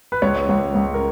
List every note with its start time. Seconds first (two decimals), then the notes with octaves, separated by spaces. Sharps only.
0.12 B4
0.22 C#2 C#5
0.49 C#2
0.75 C#2
0.94 A#4